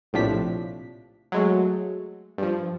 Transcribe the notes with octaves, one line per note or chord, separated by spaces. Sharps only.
A#1 A2 C3 F3 D4 B6
F#3 G#3 A3
G2 F3